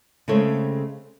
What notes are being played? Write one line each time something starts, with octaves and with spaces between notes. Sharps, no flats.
C#3 G#3 A3 C4 A4 C#5